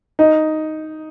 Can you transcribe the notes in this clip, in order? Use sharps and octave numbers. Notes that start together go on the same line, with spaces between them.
D#4